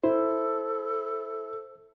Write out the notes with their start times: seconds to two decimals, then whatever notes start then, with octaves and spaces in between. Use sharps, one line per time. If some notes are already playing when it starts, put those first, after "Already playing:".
0.04 E4 A4 C5